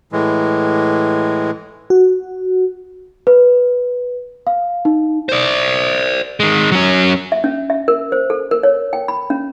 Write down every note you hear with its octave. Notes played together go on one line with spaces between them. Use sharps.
A2 E3 G#3
F#4
B4
F5
D#4
C5 D5
D#3 G#3
F#3 C#4
E5
C#4
E5
A#4
C5
A4
A#4
C#5
G5
B5
C#4